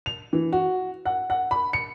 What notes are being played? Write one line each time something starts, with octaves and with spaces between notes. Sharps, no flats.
F7
E3
F#4
F#5
F#5
B5
C#7